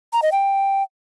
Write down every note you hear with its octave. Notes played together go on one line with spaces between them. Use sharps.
A#5
D#5
G5